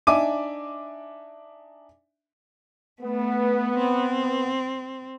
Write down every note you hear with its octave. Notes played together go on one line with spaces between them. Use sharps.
D4 D#4 E5 G#5 D6 D#7
A3 B3
C4